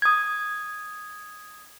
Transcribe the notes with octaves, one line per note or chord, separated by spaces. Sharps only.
D#6 G#6